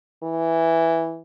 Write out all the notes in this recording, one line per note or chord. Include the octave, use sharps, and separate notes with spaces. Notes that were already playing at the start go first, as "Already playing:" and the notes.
E3